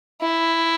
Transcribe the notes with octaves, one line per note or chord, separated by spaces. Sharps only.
E4